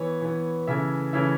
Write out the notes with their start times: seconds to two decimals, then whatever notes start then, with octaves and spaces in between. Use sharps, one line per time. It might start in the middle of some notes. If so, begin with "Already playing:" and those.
Already playing: E3 B3 C#5
0.22 E3 B3
0.67 C#3 E3 A3 C#4 E5
1.13 C#3 E3 A3 C#4 E5